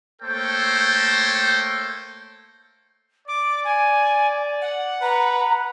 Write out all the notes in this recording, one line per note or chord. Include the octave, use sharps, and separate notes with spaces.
A3 A#3 A4 C5 C#5 G5
D5 D6
G#5
F#5
B4 A#5